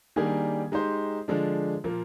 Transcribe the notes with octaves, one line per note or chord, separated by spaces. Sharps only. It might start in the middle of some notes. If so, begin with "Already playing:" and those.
D#3 G3 A#3 D4 G#4
G#3 D#4 G4 C5
D3 F3 G#3 D4
A#2 F3 A#3